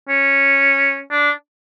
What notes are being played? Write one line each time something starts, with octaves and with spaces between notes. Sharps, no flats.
C#4
D4